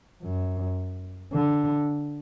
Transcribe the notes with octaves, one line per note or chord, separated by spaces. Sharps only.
F#2
D3